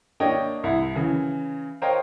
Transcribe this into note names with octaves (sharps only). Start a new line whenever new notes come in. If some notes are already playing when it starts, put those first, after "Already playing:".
A#3 D4 C#5 D#5 G5
C2 E4
C#3 E3
A#4 C5 C#5 D#5 F5 G5